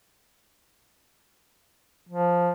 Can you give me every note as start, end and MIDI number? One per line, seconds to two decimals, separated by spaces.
2.09 2.52 53